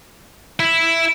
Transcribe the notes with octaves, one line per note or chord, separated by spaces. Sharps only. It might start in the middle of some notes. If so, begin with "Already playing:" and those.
E4